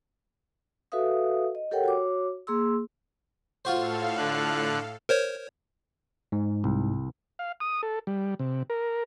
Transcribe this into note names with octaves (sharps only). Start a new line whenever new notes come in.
F#4 A4 B4 E5 F5 D#6
D#5
G4 A4 A#4 C#5 F#5 G5
F#4 C#5 D6
A#3 G#4 C6 E6
A2 F4 F#4 A4 C5 F5
D3 F#6
A#4 C5 C#5
G#2
C2
F5
D#6
A4
G3
C3
A#4